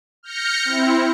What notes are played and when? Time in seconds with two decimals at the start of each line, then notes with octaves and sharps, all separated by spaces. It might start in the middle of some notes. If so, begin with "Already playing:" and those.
0.23 F6 G6 A#6 C#7
0.65 C4 E4